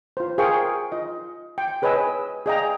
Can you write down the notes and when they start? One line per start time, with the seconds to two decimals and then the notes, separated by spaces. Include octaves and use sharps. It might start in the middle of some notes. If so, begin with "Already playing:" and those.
0.17 F4 C5
0.38 G#4 A#4 C5 F5 G5 C#6
0.92 F4 D#5
1.58 G5
1.82 G#4 B4 C#5 D#5 G#5 E6
2.46 G#4 D5 D#5 F5 G5 A#5